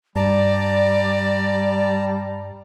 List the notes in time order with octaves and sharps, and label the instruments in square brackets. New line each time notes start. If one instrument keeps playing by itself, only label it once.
[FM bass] G2 [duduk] G3 [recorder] D5 [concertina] A5 A#5